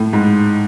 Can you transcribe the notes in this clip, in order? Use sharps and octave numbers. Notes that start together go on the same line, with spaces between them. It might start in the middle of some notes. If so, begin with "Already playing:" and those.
Already playing: A2
G#2